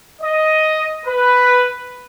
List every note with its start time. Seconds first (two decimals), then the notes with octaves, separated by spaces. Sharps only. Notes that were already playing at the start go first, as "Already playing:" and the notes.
0.22 D#5
1.06 B4